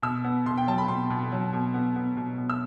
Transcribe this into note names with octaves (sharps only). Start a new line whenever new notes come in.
B2 E6
B3
B2 C6
G5
F#3 A5
B5
B2 C6
B2
F#3
B2
B3
B3
B2
B2
E6